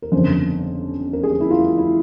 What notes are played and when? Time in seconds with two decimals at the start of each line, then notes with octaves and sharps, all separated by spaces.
0.02 A#4
0.12 G1 F2 C#3 C5
1.13 A#4
1.23 G#4
1.40 E4
1.50 F4
1.78 E4